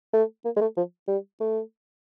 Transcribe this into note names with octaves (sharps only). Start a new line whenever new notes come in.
A3
A#3
G#3
A3
F3
G3
A3